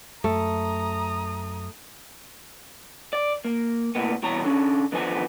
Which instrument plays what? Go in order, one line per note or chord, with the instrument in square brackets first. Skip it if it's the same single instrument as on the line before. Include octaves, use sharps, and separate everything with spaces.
[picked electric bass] F#2 [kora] A3 [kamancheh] A#5 D#6
[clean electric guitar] D5
A#3
A2 C3 A#3 B3
C2 B2 E3 C#5 A#5
D3 C#4
D3 D#3 F3 B3 C5 G#5